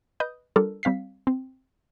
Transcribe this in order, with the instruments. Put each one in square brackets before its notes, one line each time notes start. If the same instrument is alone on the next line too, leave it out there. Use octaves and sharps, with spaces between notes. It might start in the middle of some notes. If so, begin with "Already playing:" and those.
[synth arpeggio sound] B4 D#5 D#6 G6
G3 D4 F4 A4 A#4
G3 C4 F5 B6 C7
C4